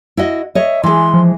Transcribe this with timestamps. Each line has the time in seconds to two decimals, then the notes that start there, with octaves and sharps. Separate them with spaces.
0.17 E4 F#4 D#5
0.55 C#5 D#5 E5
0.83 E3 G#3 C6
1.14 F3